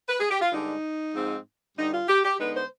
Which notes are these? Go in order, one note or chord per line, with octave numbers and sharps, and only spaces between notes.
B4
G#4
G4
F4
G2 D3 G#3 D4 D#4
G#2 F3 C4
G2 D3 G3 D#4
F4
G4
G4
D3 G#3 B3 D#4 B4
C5